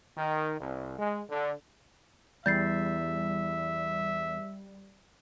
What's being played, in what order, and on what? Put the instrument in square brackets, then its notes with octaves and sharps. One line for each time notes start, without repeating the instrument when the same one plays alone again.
[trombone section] D#3
C2
G#3
D3
[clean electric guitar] E2 [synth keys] G3 [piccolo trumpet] E5 [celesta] G6 A6 C7